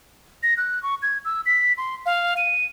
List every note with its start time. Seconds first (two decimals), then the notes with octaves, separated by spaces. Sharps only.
0.43 A#6
0.57 F#6
0.83 C#6
1.02 G#6
1.25 E6
1.46 B6
1.78 C6
2.06 F5
2.37 D#7